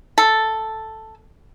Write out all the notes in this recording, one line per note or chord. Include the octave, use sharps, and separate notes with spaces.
A4